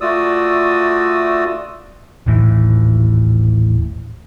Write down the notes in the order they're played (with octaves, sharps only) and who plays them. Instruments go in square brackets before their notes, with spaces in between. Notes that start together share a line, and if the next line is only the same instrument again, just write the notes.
[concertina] A3 F4 F#4 D5 D#6 E6
[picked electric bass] D#1 A1 A2 E3